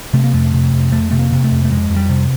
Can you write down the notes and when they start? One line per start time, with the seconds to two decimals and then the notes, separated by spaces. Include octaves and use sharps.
0.13 C3 A3
0.24 A#3
0.34 F2 A3
0.54 C3
0.72 F2
0.92 F2 A3
1.11 C3 A3
1.19 A#3
1.32 C3
1.44 A3
1.51 F2
1.64 A3
1.71 F2 G#3
1.90 F2
1.96 G3
2.09 C3